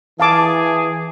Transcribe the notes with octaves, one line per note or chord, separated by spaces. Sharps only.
E3 G#4 F5 A5 D6